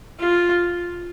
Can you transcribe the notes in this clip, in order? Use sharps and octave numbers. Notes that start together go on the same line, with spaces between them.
F4